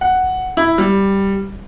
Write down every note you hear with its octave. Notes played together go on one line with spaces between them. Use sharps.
F#5
E4
G3